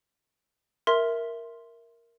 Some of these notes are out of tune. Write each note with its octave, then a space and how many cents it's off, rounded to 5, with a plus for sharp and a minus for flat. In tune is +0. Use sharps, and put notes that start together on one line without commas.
A#4 +0 E5 +0 C6 +0